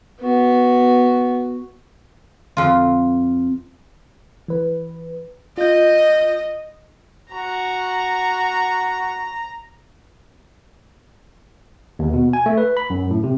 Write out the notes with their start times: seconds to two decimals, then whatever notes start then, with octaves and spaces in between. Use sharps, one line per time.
0.21 B3 F#4
2.57 F2 F4
4.48 E3 B4
5.58 F4 D#5 G6
7.32 F#4 A#5
11.99 D#2
12.13 B2
12.33 G#5
12.46 A3
12.58 B4
12.77 B5
12.90 F#2
13.11 A2
13.24 C3